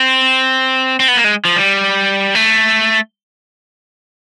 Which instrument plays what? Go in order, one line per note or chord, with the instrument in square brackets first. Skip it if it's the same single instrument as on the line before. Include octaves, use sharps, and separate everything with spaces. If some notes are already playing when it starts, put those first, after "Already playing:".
Already playing: [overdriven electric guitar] C4
C4
B3
A#3
G#3
F3
G3
A3